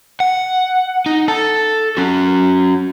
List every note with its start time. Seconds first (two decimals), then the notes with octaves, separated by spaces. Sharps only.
0.20 F#5
1.06 D#4
1.28 A4 A5
1.97 C#4 F#4